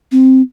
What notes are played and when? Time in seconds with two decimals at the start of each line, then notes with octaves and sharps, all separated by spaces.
0.12 C4